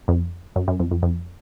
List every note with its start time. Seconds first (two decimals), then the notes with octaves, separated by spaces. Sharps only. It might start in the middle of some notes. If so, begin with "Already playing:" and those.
0.08 F2
0.56 F#2
0.68 F#2
0.80 F2
0.91 F2
1.03 F2